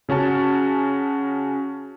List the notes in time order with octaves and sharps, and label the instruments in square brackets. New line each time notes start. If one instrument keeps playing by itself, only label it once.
[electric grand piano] C#3 C#4 F#4 A5